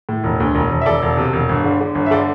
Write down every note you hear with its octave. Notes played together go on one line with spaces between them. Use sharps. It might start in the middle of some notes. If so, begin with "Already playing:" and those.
A2
E1
D2
E1
E1
E5
E1 A4 D5
E1
C3
E1
G1
D3
D3
G1
E5
D3 A4 D5